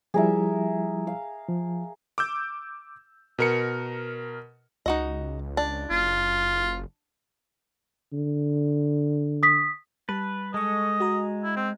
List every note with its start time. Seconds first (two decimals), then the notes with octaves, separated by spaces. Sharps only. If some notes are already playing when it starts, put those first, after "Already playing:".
0.14 F3 G3 E4 G#4 A#4 E5
1.07 F5
1.49 F3
2.18 D6 E6 G6
3.39 B2 A#4 C#7
4.86 C#2 D#4 F#4 D#5
5.57 D4
5.90 F#1 F4
8.13 D3
9.43 D#6 B6
10.09 G3 B4 A5
10.54 G#3 A4 D#5 C#6
11.00 F#4 G#5 A#5
11.44 E4
11.56 C4